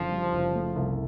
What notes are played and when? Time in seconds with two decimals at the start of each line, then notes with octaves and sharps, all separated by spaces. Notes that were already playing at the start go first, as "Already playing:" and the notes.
Already playing: F#1 F#2 D3 F3
0.11 G3
0.33 F#1
0.55 A3
0.76 C2